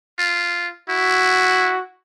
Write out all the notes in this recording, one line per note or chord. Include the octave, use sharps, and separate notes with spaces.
F4
E4 F#4